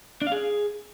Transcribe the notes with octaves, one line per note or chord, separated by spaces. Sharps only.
D4
F5
G#4